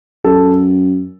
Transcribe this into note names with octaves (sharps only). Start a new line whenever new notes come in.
F#2 A4